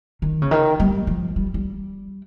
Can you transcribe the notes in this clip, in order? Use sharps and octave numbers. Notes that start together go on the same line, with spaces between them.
D#3
C#3
D#3
G3
F3
G3
G3